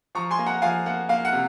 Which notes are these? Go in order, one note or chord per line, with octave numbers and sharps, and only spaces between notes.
F3 A#5 C#6
G#5 C6
A#3
F#5 A#5
F3 F5 G#5
A#3 F#5
A#3 F5
F#5
C3